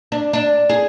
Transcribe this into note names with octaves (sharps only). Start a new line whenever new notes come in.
D4
D4
G#4